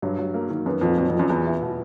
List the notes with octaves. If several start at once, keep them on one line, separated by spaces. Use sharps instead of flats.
G2 F#3
F#3
A#3
D#3
F#2 B3
F2 A#2
F2 F#3
F2
A#2
F#2
E2 B3
E4
B2